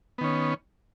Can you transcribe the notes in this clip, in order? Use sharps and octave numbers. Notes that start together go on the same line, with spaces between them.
D#3 B3 C#4